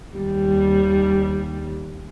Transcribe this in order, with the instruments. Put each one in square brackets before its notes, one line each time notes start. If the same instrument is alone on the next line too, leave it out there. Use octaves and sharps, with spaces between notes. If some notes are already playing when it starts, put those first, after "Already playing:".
[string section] D#2 G3